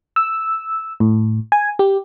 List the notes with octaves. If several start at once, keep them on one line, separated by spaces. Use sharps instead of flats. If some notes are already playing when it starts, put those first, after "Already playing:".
E6
A2
G#5
G4